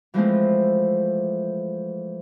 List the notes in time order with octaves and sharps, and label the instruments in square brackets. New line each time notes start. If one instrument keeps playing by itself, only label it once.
[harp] E3 F3 G#3 A3 C4